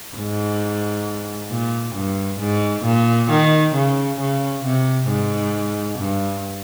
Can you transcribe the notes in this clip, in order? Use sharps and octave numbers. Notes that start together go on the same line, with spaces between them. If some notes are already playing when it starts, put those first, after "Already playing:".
G#2
A#2
G2
G#2
A#2
D#3
C#3
C#3
C3
G#2
G2